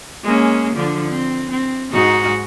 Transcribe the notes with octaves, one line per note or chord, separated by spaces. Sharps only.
G#3 A#3 C#4
D3 F3 D4
C4
C4
G#2 D#4 F#4